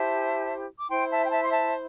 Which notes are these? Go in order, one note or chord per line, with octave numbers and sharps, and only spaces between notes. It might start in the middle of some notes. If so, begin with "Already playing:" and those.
Already playing: E4 G4 C5 E5 A5
D6
E4 C5 G5 C6
E5 A5
G5
E5 A5
C6
E5 A5